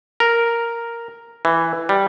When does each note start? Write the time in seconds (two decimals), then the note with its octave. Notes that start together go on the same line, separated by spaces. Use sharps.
0.20 A#4
1.45 E3
1.89 G3